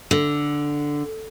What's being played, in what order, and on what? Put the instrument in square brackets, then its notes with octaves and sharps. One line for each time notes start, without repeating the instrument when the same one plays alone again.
[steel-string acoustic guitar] D3